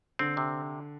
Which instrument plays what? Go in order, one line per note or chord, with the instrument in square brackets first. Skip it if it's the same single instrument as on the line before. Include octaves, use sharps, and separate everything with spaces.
[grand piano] D3 [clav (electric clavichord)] C4
[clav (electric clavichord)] C3